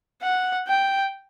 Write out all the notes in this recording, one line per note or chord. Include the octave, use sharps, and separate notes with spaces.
F#5
G5